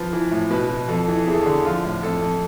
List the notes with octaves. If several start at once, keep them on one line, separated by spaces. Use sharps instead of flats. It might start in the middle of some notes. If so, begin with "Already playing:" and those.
Already playing: F3 B4
E3
A2
B2 B4
B2
F2 A4
E3
E2 G#4
A4
D3 G#4
F3 F4
A2
F2 A4
F2